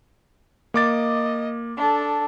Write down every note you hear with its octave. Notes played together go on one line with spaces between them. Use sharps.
A#3 D#5 D6 A6
D4 A4